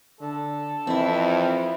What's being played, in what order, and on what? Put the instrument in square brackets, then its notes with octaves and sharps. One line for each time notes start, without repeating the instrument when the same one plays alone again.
[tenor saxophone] D3 [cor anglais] A4
[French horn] F2 [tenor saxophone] E3 [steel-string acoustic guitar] C4 E4